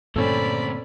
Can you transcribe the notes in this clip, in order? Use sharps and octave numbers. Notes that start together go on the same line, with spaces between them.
D2 G2 A#2 C4 C#4 A4 D5 B5